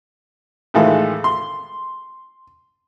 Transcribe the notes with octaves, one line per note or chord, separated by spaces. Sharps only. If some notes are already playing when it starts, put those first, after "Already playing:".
A2 D#3 E3 G#3 F4 A4
C6